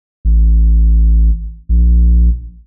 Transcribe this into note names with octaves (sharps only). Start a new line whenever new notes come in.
A1
A#1